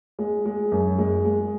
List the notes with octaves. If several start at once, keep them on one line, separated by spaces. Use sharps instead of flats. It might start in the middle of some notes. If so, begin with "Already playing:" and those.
G#3
G#3
F#2
G#3
G#3